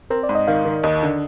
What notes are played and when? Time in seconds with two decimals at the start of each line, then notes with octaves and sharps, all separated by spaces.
0.10 C4 A#4
0.23 D5
0.29 G#2
0.35 D#5
0.47 D#3 F5
0.65 D#3
0.83 D#2 D#5
1.03 D3